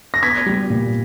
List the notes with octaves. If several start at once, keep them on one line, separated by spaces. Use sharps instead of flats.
A#6
B3 G#6 B6
G3
A#2